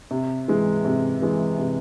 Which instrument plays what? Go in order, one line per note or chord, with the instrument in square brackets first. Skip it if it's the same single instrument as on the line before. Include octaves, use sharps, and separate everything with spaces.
[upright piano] C3
E3 G#3
C3
E3 G#3
C3